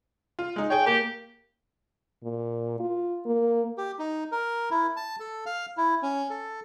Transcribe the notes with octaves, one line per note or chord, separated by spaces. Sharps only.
F4
G#3 D#4
G#4 C#5 G5
A#3 G4
A#2
F4
A#3
G4
D#4
A#4
E4
A5
A4
F5
E4
C#4
A4